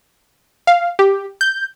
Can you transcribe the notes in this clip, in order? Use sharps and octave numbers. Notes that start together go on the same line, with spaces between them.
F5
G4
G6